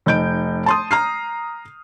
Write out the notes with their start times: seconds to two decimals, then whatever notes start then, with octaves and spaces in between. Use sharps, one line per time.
0.06 F1 D#4 G6 D7
0.66 A5 C6 D#6
0.91 A#5 F6 C7